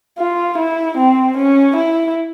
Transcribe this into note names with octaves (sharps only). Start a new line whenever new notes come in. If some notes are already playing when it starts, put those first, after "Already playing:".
F4
E4
C4
C#4
E4